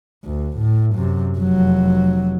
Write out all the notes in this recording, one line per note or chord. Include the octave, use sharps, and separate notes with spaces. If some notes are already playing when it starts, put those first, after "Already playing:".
D2
A2
F#2 C3
F1 F#3